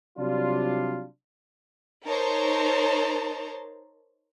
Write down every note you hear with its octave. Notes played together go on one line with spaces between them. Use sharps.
C3 F#3 G3 D4 F4
D#4 A#4 C5 C#5 A5 A#5